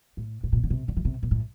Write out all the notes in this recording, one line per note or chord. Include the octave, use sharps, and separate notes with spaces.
A2
A2
A#2
D3
C3
D3
E3
C3
A#2
A2